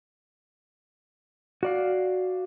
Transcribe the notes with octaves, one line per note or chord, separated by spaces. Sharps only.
F#4 D5 F5